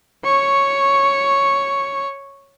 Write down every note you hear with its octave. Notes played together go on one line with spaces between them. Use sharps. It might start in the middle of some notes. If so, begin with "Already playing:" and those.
C#5 C#6